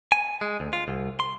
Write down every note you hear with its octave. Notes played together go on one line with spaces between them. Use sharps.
G#5
G#3
D2
F4
C2
C6